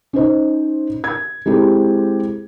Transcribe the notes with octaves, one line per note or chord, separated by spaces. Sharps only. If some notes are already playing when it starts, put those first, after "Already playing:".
C#4 D#4 C5 D#5
G#6
G#3 C4 E4 G4 A4